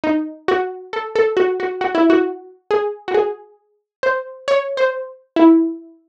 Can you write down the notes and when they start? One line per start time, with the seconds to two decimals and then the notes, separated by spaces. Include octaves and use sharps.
0.04 D#4
0.48 F#4
0.93 A4
1.16 A4
1.37 F#4
1.60 F#4
1.81 F#4
1.95 E4
2.10 F#4
2.71 G#4
3.08 F#4
3.14 G#4
4.03 C5
4.48 C#5
4.77 C5
5.36 E4